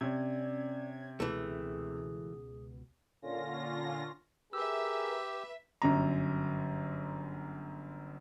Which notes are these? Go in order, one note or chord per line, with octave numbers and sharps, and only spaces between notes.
C3 C#4 D5 G#6
C#2 B2 E3 A3 G#4
A#2 D3 C#4 F4 A#6
G4 G#4 A#4 B4 E5 E6
G1 F#2 A#5